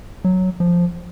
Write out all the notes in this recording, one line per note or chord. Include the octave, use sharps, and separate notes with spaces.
F#3
F3